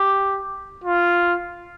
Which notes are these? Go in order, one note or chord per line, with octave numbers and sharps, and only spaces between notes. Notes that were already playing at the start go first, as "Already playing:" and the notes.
Already playing: G4
F4